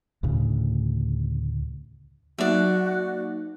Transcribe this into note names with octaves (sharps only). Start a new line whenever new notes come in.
D2 A2 C#3
F#3 A#3 D#4 F#4 D5 E5